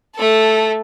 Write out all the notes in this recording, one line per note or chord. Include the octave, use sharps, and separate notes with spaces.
A3 A4